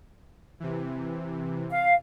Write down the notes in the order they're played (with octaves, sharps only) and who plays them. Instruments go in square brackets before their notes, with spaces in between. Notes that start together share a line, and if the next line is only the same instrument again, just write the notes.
[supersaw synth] C3 E3
[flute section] F5